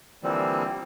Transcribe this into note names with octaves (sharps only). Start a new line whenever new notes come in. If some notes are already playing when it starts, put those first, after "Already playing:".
D3 E3 F3 G3 A#3 C4